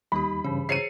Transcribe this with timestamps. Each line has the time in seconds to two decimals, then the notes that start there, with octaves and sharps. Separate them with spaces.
0.12 D#2 G3 D#4 G4 B5
0.44 G2 C#3 E3 G#4
0.69 G#4 C5 C#5 C7 C#7 D#7